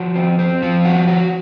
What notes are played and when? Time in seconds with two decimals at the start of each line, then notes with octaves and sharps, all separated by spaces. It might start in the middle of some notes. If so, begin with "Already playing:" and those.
Already playing: F3 F#4
0.15 C4
0.39 C4
0.62 F3
0.85 F#4
1.08 F#4